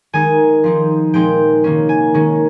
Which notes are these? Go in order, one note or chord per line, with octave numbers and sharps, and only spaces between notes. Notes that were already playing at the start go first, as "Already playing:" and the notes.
D#3 G#3 D#4 G#5
F3 C4 D#4
A#2 F3 G#3 C4 D#4 G5
C3 D#3 A#3 C#4
G#5
D#3 G#3 C#4